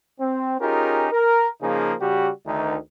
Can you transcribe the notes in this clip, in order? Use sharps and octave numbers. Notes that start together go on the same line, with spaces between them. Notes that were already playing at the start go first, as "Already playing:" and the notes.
C4
C#4 D#4 F4 G4 G#4 A#4
A#4
C#3 F3 A#3 D#4 G#4
C#3 G3 F#4 G4
D2 D#3 D#4